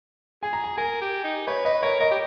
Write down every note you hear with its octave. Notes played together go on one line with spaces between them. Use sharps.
G#4 G#5
A#5
G#5
A#4 G#5
G4
D#4
B4 C#5
B4 D#5
A#4 C#5
A#4 D#5
G4